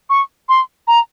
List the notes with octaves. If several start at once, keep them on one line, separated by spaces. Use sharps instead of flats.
C#6
C6
A#5